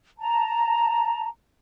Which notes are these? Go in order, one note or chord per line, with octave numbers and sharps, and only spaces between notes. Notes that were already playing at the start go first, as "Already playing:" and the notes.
A5 A#5